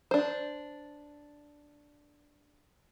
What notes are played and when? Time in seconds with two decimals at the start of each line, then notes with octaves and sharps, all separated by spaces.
0.11 D4 C5